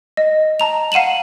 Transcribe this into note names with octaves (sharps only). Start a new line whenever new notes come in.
D#5
A5 A#5 F7
F5 F#5 D#7 E7 F#7